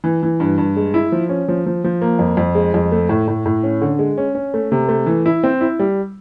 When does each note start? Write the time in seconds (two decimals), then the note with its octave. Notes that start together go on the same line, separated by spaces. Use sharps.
0.04 E3
0.23 E3
0.40 G2
0.58 G2
0.77 G#3
0.94 E4
1.12 F3
1.29 C#4
1.48 F3
1.66 F3
1.84 F3
2.02 A#3
2.19 F2
2.37 F2
2.55 G#3
2.74 F2
2.92 A3
3.09 A2
3.28 A2
3.46 A2
3.63 C#4
3.81 D3
3.99 G#3
4.18 C#4
4.35 C#4
4.54 A3
4.72 C3
4.89 A3
5.06 E3
5.26 E4
5.43 C4
5.61 E4
5.79 G3